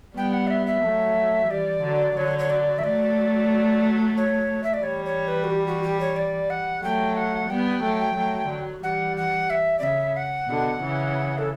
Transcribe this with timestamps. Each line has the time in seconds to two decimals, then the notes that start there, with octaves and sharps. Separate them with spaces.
0.17 G3 B3 G5
0.33 F#5
0.47 D5
0.50 E5
0.67 E5
0.83 F#3 A3
1.50 E3 G3 D5
1.84 D3 F#3
2.17 D3 F#3 C#5
2.39 C#5
2.50 D5
2.79 E5
2.84 F#3 A3 D5
4.17 C#5
4.64 E5
4.74 D5
4.83 E3 G3 C#5
5.06 C#5
5.28 B4
5.44 F#4
5.50 G4
5.67 F#4
5.83 G4
6.00 C#5
6.16 D5
6.50 F#5
6.83 F#3 A3 G5
7.17 F#5
7.50 G3 B3 G5
7.83 F#3 A3
8.17 F#3 A3
8.50 D3 F#3
8.83 E3 G3 F#5
9.17 F#5
9.50 E5
9.79 D5
9.83 C#3 E5
10.16 F#5
10.49 B2 D3
10.83 C#3 E3
11.38 A4